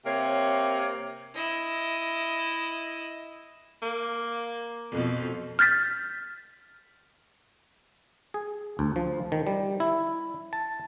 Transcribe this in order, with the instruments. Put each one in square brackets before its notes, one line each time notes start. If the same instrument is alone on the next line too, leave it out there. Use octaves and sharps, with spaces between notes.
[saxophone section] C3 A#3 C#5
[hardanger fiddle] E4 D#5
[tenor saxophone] A#3
[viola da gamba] F2 B2
[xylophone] F6 G6 A6 B6
[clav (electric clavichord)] G#4
D2
F3
D#3
G3
E4
A5